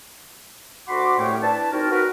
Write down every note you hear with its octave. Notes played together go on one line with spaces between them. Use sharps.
D2 F#4 F#5 B5 C6 D6
C2 A2 A3 C#4 C#5 G5
D4 E4 B4 A5
C4 D#4 F#4 A#4
F#4 A#4 B4